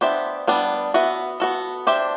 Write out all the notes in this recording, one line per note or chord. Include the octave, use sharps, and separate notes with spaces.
B3 D4 G4 C5 E5
G3 B3 D4
B3 F#4 B4 E5
B3 F#4 A4
D4 G4 C5 E5